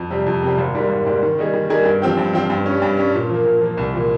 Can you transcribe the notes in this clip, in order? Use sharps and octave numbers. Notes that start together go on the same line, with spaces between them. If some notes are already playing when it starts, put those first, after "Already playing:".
Already playing: F2
C3 G3 C4
F2
C3 G3 C4
G#1
G#2 G3 A#3
G#1
G#2 G3 A#3
D#3
G3 A#3 D#4 G#4
D#3
G3 A#3 D#4 G#4
G2
F3 C4 G4
G2
F3 C4 G4
G2
G3 C#4
G2
G3 C#4
A#2
F3 A#3
A#2
F3 A#3
C2
A#2 F3 A#3